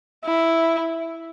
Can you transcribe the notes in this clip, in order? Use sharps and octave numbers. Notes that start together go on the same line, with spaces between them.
E4